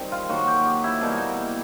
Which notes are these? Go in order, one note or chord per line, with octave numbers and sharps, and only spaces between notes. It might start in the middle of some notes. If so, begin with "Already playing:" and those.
Already playing: D#3 G3 C4 D#4
F4
D#3 F#3 A#3 F#4
G4
G4
E4
B2 G3 A#3 D#4 E4